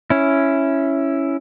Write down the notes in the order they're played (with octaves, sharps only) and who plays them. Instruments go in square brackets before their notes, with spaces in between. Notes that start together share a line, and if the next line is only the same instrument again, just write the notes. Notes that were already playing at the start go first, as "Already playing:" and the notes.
[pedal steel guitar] C#4 E4